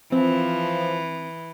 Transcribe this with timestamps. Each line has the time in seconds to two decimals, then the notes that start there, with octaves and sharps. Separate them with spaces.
0.12 E3 F3 C4